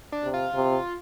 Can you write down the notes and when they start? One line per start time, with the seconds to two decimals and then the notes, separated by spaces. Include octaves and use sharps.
0.12 D4
0.24 C3
0.34 F4
0.54 C3